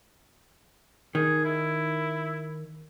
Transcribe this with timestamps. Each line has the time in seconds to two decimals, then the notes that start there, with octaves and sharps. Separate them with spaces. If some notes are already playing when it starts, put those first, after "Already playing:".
1.15 D#3 G#4
1.45 E4